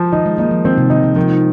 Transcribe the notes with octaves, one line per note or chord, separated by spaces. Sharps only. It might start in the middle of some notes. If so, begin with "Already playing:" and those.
Already playing: F3
D#3 D#4
G#3
A#3 D#4
F3
D#3 C4
C3
D#3 D#4
D#3
D#3 F3